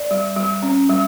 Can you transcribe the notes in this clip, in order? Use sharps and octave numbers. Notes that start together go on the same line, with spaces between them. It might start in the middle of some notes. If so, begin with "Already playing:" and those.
Already playing: D5
G3
G3
C#4
G3